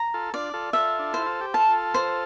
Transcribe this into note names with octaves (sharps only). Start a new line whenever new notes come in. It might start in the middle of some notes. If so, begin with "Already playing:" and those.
Already playing: A#5
F4 A4
D4 F4 D5
F4 A4
F4 A4 E5
D4
E4 C5
F4
G4
F4 A4 A5
C5